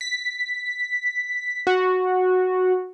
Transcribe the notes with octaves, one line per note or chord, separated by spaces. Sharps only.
B6
F#4